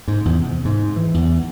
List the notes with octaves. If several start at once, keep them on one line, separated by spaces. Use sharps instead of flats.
G#2
E2
C3
G#2
E3
E2